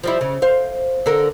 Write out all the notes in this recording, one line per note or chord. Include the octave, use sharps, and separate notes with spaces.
F3 G3 E4
C#3
C5 F5
D3 A4 A#4